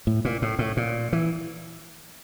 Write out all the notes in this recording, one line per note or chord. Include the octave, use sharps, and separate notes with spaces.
A2
A#2
A2
A2
A#2
E3